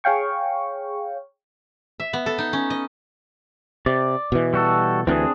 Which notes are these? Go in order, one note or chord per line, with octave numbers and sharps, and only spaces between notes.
G#4 C#5 F5 G5 C#6
E5
B3
A4
D#4
C#4
D#5
C3 D5
B2 E3
G3 F#4 A4
D2 E3 C4 D4 G#4